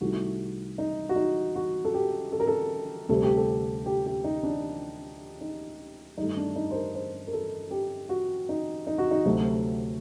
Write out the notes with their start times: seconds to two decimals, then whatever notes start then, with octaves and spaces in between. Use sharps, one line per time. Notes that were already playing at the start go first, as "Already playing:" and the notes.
0.01 C2 C3 D#3 A3 F#4
0.78 D#4
1.09 F#4
1.16 D#4
1.56 F#4
1.85 A4
1.94 G4
2.32 A4
2.40 A#4
2.47 A4
3.09 D2 C3 G3 A4
3.23 G4
3.37 A4
3.86 G4
4.06 G4
4.24 D#4
4.43 D4
5.41 D#4
6.18 G2 D#3 A3 D#4
6.37 D4
6.56 D#4
6.71 C5
6.74 A#4
6.95 C5
7.27 A#4
7.33 A4
7.71 G4
8.09 F#4
8.49 D#4
8.87 D#4
8.98 F#4
9.11 D#4
9.25 D2 C3 F#3 A3 F#4